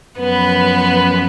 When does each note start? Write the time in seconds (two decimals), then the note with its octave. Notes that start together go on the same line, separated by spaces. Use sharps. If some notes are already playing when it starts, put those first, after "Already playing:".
0.18 F#2 F3 B3 B4